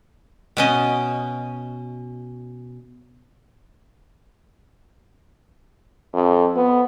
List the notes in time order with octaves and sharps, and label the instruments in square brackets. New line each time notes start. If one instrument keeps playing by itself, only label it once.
[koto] B2 C#4 D#5
[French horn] F2
B3